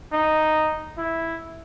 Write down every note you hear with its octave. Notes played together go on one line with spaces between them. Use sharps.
D#4
E4